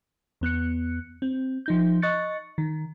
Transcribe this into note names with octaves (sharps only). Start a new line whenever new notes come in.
E2 B3 F#6 C#7
C4
F3 D#4 G6
D#5 C#6 F#6 A6 C#7
D#3